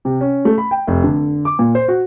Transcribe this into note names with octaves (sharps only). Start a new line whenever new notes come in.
C3
C#4
A3
B5
G5
F1
D3
D6
A#2
C5
F#4